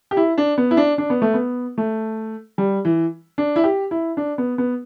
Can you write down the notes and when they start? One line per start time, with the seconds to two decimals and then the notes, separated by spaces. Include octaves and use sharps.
0.11 G4
0.17 E4
0.38 D4
0.58 B3
0.71 E4
0.77 D4
0.98 D4
1.10 B3
1.22 A3
1.34 B3
1.78 A3
2.58 G3
2.85 E3
3.38 D4
3.56 E4
3.64 G4
3.91 E4
4.17 D4
4.38 B3
4.58 B3